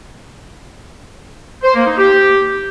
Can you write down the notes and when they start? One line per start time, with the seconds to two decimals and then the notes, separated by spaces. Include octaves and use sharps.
1.63 C5
1.75 A#3
1.86 D#4
1.98 G4